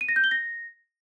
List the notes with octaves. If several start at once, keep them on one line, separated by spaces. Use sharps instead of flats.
D#7
A#6
G6
G7
A#6